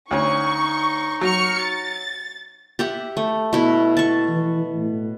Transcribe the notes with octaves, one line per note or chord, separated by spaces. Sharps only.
D2 C#4 D#4 C#6
F#3 C#6 F6 C#7
A6
G4 E5 F#5
A3
B2 E4
A5 C#6
E3
A2